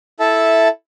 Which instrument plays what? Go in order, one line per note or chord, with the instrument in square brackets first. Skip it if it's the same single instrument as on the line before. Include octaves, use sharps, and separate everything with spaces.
[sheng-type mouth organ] E4 A4 E5 A5